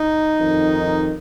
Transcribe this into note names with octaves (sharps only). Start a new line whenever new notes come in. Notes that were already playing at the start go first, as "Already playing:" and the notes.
Already playing: D#4
F2 D#3